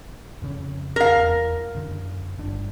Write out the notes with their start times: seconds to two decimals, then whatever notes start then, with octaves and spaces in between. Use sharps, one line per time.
0.42 F2 C#3 C#4
0.96 A#4 F5
1.17 E2
1.75 F#2 D3
2.38 G1 D4